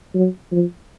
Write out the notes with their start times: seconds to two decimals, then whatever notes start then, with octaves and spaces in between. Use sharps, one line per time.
0.15 F#3
0.52 F3